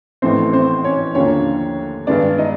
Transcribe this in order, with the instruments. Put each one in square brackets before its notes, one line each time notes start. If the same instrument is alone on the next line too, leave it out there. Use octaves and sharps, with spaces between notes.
[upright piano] A1 A2 E3 A3 C4 C5
C4 C5
C#4 C#5
D#2 D3 F3 A#3 C#4 C#5
G2 D#3 G#3 B3 D4 D5
D#4 D#5